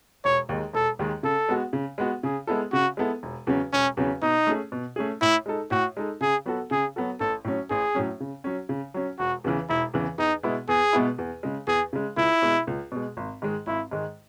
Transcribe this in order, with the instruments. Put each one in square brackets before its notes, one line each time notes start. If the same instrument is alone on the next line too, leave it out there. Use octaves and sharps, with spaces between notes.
[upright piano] E1 [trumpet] C#5
[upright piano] D#2 D#3 G#3
[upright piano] E1 [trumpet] A4
[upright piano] D#2 D#3 G#3
[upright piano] C#3 [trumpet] A4
[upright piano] G#3 B3 F#4
C#3
G#3 B3 F#4
[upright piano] C#3 [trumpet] G#4
[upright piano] G#3 B3 E4 A4
[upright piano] C#3 [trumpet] F#4
[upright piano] G#3 B3 E4 A4
E1
E2 C#3 F#3 C#4
[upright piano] E1 [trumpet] C#4
[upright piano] E2 C#3 F#3 C#4
[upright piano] B2 [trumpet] D#4
[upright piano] A3 C#4 G#4
B2
A3 C#4 G#4
[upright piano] A2 [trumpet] E4
[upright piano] G#3 D#4 A4
[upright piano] A2 [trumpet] F#4
[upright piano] G#3 D#4 A4
[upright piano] C#3 [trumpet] G#4
[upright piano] F#3 B3 F#4 A4
[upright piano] C#3 [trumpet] G#4
[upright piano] F#3 B3 F#4 A4
[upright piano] A1 [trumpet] A4
[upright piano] A2 F#3 C#4
[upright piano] A1 [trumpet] G#4
[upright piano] A2 F#3 C#4
C#3
F#3 C#4
C#3
F#3 C#4
[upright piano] E1 [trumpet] F#4
[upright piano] E2 C#3 E3
[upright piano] E1 [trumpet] E4
[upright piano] E2 C#3 E3
[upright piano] E2 [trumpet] D#4
[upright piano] B2 G#3 B3 E4
[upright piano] E2 [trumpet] G#4
[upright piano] B2 G#3 B3 E4
E2
C#3 G#3
[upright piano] E2 [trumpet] G#4
[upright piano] C#3 G#3
[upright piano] C#2 [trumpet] E4
[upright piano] B2 G#3
C#2
B2 G#3
G#1
G#2 D#3 G#3
[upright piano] G#1 [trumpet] E4
[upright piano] G#2 D#3 G#3